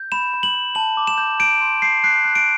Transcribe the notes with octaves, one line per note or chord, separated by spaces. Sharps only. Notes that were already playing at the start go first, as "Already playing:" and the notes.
Already playing: G6
B5 E7
B5
F#7
B5
A5 F#7
D6
E7
G6
G6 D7
C6
G6 C7
F#6 C7
F#6
D7